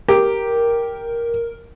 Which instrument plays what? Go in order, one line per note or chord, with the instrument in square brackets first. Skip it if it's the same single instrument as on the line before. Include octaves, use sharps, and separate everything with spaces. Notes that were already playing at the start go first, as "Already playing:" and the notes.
[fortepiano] G4 [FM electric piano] A#4